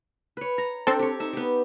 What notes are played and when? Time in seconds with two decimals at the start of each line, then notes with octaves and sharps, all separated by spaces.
0.37 B4 C#5
0.58 A#5
0.87 C4 D4 A4
0.99 G4 C#5
1.20 D#4 E5
1.33 B3 G4